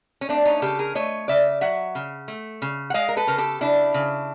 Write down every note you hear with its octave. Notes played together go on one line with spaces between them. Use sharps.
C#4
A3 C4 D4
C#4 D#4
C#3 G4 A4
G#4 A#4
A3 C#5 D#5
C#3 D5 E5
F#3 E5 F#5
C#3
A3
C#3
F#5
G#3 D#5 F5
A#4
A4 B4
C#3 A#4
G4 A4
C#3 D4 E4
C#3